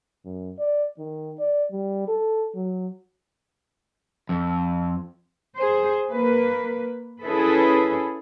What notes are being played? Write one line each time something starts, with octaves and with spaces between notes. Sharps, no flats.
F#2
D5
D#3
D5
G3
A4
F#3
F2
G#4 C5
A#3 B4
C#4 E4 G#4 A4 B4